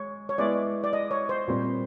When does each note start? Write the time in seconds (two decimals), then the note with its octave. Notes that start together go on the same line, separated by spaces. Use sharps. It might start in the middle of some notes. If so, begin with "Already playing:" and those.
Already playing: G#3 C#5
0.29 C#5
0.38 G#3 B3 E4 D5
0.84 D5
0.93 D#5
1.11 C#5
1.29 C5
1.48 A#2 G3 C4